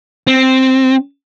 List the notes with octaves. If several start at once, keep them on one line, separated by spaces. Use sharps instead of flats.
C4